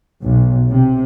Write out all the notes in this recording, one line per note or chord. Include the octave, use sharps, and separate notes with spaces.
B1
C3